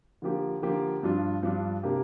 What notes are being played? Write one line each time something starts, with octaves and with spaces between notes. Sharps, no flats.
D3 F3 A#3 G4
D3 F3 A#3 G4
G2 F3 D4 F4
G2 F3 D4 F4
C3 A#3 D4 G4